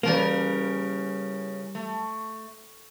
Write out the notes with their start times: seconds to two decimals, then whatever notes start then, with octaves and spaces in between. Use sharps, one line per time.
0.03 C#3 E3 G3 A#3 A#4
1.75 A3